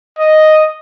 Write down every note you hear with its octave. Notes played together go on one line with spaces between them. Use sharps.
D#5